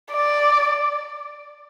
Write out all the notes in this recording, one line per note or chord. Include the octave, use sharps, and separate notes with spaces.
D5